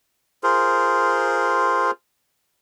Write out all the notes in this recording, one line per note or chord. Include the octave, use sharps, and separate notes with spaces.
F4 G#4 A#4 C5